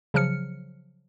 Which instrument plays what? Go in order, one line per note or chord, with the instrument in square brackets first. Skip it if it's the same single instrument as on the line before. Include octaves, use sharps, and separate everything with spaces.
[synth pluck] C#3 F3 F#3 F6 C#7